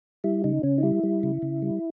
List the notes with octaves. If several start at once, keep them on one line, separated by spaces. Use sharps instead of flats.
G3 E4
C#3 D#4
C#3 C#4
D#4
G3 E4
G3
C#3
C#3
G3